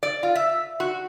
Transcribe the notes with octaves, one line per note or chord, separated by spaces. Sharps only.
D5
F4
E5
F#4